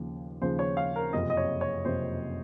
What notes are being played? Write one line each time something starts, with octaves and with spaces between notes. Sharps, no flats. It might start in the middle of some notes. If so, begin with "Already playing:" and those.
Already playing: D#2 C#3 F3
D#2 C#3 F3 C5
C#5
F5
A#4
F#1 F2 C3 D#5
D#5
C#5
C#5
F#1 F2 C3 C5